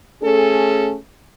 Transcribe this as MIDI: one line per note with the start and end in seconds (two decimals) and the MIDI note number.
0.22 0.95 57
0.22 0.95 61
0.22 0.95 68
0.22 0.95 69